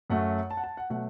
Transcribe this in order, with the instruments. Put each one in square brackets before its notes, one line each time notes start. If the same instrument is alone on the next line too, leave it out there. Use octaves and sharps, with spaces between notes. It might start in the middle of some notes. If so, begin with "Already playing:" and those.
[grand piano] F#2 F#3 A3 F#5
A5
F#5
A5
F#5
B2 F#3 A3 F#5